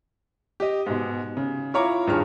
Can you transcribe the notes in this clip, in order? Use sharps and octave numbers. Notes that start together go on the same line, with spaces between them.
G4 D#5
G#2 B2
C#3
E4 F4 C#5 F5 A#5 D6
D#1 G2 D#3 G3 G#4 F6